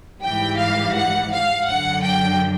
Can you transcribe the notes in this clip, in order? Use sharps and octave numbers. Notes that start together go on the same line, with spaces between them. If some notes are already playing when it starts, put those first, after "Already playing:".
G#2 E3 G3 G5
F5
F#5
F5
F#2 D3 F#3 F#5
G5